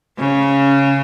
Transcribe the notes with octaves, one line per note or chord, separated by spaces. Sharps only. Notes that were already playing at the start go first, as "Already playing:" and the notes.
C#3